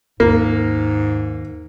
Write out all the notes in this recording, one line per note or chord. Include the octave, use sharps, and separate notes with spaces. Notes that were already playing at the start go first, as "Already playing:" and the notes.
D#2 G#2 A#3